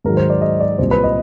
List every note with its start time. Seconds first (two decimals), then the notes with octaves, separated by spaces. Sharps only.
0.04 G#2 D#3 F#3 A#4
0.17 C5
0.30 D5
0.41 D#5
0.61 D5
0.78 C2 A#2 G3 C5
0.91 B4
1.04 D#5